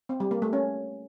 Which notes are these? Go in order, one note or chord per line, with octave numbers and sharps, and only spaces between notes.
C4
G3
A#3
A3
C#4